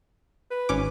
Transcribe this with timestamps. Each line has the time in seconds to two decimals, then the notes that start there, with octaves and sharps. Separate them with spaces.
0.51 B4
0.69 G#1 C#4 D6